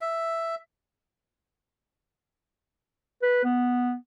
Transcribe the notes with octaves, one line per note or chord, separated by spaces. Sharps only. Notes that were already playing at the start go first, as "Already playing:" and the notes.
E5
B4
B3